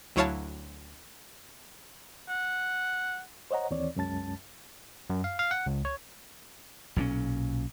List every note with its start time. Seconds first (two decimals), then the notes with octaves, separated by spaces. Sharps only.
0.16 D2 F#3 E4 C#5 F5 A5
2.29 F#5
3.51 C5 C#5 D#5 F#5 A#5
3.71 D#2 E3 C4 C#5 D5
3.96 C2 F#2 G#3 C#4 A5 A6
5.10 F#2
5.24 F5
5.39 F5
5.51 F#5
5.66 C#2
5.85 C#5
6.96 B1 A#2 C4 C#4